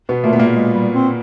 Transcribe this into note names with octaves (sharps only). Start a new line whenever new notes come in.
B2 B3
A#2 A3 A#3
B3
A#2 A#3
G#3
G3
C4